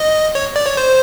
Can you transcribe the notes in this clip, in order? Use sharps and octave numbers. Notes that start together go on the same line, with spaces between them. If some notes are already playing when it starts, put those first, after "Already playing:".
Already playing: D#5
C#5
D5
C#5
C5